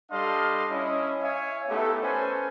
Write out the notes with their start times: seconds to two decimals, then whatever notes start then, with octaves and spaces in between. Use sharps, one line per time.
0.11 G3 D4 A4 D#5 F5 C6
0.71 C#4 E4 D#5
1.21 C#5 E5 F5 G#5
1.68 A3 B3 D#4 E4 G4 A4
2.01 C#4 A4 B4 C5 G#5